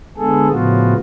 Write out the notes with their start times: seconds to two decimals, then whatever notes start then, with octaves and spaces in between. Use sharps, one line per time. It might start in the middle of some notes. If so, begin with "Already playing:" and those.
0.18 D3 G#3 B3 G#4 A4
0.51 A2 C#3 F3 B3 F4 F#4